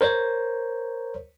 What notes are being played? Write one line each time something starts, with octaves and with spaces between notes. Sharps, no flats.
A#4 C5 C#5